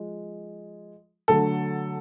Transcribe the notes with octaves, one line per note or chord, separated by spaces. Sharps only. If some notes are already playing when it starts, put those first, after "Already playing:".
Already playing: F3 G#3
D3 F#3 A3 A4